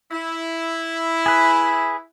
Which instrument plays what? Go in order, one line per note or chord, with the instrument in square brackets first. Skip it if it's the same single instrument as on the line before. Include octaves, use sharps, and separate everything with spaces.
[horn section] E4
[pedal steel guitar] G#4 B4